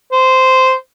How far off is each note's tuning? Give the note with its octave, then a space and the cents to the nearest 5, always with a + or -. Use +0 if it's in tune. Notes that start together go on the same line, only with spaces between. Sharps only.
C5 -10